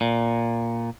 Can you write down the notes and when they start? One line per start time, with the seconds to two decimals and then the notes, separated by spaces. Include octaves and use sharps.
0.01 A#2